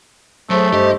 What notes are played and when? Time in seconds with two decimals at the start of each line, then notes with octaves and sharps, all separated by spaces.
0.50 F#3 A3 G#4 C5 C6
0.72 G2 G4 C5 D#5